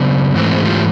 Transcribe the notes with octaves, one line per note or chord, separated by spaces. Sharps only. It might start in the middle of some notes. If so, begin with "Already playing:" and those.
Already playing: C#3 F#3 B3 D4
G#2 E3 A3 C4
G#4
F4 G4